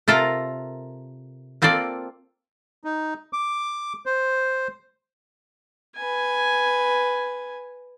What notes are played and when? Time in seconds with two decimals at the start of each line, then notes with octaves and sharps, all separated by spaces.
0.08 C3 F4 A4 A#4 A#5
1.62 A#3 C4 F4 A4 D5
2.84 D#4
3.33 D6
4.06 C5
5.96 B4 G#5